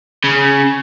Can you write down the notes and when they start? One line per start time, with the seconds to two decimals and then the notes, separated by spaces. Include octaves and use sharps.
0.24 C#3